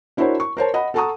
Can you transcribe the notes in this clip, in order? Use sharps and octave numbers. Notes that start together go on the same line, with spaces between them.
D4 E4 F#4 A#4 C5 C#5
C#6
A#4 C5 C#5 A5
D#5 F#5 B5
A4 F#5 A5 A#5 C#6 D#6